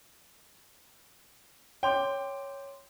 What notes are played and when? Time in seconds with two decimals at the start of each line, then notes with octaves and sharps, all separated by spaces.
1.83 C#5 G5 C6 D6